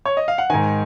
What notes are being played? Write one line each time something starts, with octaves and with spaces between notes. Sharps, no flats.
C#5
D#5
F5
F#5
G#2 D#3 G#5